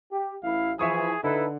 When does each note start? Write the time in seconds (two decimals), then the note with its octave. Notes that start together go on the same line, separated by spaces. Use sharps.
0.11 G4
0.43 A1 E4 F5
0.79 E3 F3 G#4 E5 C#6 D#6
1.23 D3 D#4 E4 A4 B4